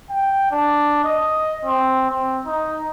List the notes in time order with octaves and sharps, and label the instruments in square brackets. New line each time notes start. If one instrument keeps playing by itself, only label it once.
[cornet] G5
D4
D#5
C4
C4
D#4